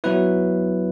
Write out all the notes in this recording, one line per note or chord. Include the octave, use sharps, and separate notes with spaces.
F#3 B3 E4 B4